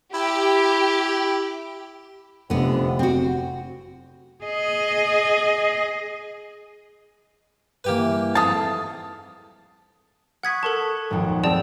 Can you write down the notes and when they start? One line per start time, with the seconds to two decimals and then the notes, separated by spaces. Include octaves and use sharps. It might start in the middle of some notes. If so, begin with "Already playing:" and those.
0.14 E4 G4
2.50 F1 D3 B3
2.99 C4 F#4
4.44 G#4 D#5
7.84 G2 E3 A#3 G4 B4
8.35 F2 G#2 F5 A5 D#6
10.43 F#5 C#6 D#6 F#6 G#6 B6
10.63 A4 A#4 A5 C#6
11.11 D#1 G#1 F2
11.44 C4 G#4 A4 D5 A5